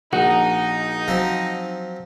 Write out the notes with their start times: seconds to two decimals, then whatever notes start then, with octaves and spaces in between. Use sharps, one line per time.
0.13 A#1 D#4 F#4
1.08 F3 F#3 C4